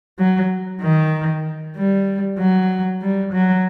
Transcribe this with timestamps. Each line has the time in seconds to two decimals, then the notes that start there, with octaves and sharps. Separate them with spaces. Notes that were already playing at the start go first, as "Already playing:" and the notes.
0.19 F#3
0.82 D#3
1.76 G3
2.39 F#3
3.01 G3
3.33 F#3